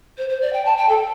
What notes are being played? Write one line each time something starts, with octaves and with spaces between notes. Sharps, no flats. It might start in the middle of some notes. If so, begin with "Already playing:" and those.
C5
C5
D5
G5
A5
G5
A4